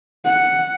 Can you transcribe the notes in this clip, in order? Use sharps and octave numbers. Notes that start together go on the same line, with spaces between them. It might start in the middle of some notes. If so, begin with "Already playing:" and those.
F#5